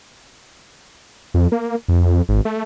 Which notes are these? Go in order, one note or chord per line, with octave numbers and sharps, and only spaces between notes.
F2
A#3
F2
G#1
A3